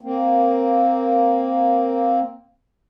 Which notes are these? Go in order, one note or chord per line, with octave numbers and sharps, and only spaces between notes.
A#3 C4